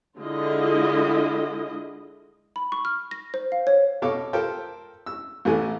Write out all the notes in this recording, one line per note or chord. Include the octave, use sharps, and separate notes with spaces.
D3 G#3 E4 F4 D#5
B5
C#6
F6
A#6
C5
F5
C#5
B2 A4 C#5 F5 D6
F4 G4 A4 A#4 C5 G5
E6
A1 E3 A3 G#5